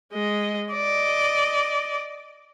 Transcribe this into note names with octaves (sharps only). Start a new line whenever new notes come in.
G#3 D#5
D5 D#5